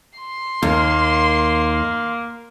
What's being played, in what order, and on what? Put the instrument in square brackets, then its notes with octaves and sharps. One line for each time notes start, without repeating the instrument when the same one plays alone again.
[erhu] C6
[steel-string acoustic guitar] D#2 [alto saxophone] A#3